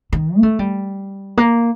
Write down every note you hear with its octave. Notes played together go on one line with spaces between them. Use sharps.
D#3
A#3
A3
G3
A#3